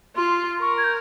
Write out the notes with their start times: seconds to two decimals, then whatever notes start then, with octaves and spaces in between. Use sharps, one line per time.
0.16 F4 C6
0.61 A#4 C#6
0.78 G#6
0.84 G6